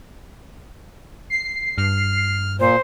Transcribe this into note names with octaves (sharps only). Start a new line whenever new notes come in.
C7
G2 F6
A#2 C5